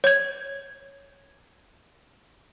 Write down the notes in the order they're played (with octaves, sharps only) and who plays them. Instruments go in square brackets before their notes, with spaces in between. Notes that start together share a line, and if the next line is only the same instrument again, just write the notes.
[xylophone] C#5 G#6